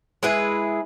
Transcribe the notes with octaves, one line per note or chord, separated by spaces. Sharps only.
G#3 E4 G#4 B4